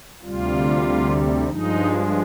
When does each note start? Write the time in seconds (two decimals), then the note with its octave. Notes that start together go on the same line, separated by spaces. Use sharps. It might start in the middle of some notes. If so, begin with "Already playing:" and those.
0.22 D2 C3 G3 F4
1.45 G2 F3 G#3 D#4